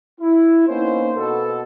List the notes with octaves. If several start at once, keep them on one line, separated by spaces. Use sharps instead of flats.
E4
A#3 B3 C#4 D#4 C5
B2 A4